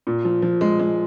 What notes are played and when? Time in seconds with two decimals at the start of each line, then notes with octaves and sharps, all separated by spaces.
0.07 A#2
0.25 F3
0.42 F3
0.61 G#3
0.79 G#3